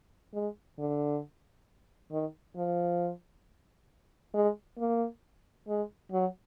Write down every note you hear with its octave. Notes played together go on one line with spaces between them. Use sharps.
G#3
D3
D#3
F3
G#3
A#3
G#3
F#3